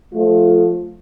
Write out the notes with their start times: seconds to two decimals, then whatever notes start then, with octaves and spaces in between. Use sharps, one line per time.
0.13 F3 A3 F4